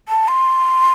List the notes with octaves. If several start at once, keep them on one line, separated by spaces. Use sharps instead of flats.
A5
C6